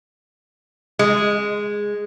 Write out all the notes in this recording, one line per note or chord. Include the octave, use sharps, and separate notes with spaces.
G#3